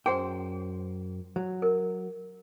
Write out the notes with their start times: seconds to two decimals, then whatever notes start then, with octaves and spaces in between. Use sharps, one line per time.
0.06 F#2 G#4 C5 F#5 G5
1.36 F#3
1.62 A#4